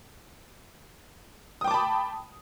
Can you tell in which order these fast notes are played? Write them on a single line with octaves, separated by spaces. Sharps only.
D#6 G5 D6 A5 B5